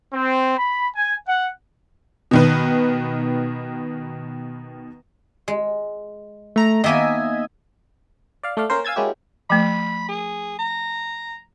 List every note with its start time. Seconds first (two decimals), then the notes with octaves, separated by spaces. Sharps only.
0.14 C4
0.58 B5
0.95 G#5
1.27 F#5
2.31 B2 D#3 B4
5.48 G#3
6.56 A3 A#5
6.84 D#3 A#3 B3 D#5 E5 G#5
8.43 D5 F5
8.57 A3 D5 F5
8.70 A#3 C#4 A#4 C5
8.85 F5 G#5 E6 G#6 A6
8.96 G#3 A#3 C#4 E4 F#4 G4
9.50 F3 A3 B5
10.09 G#4
10.59 A#5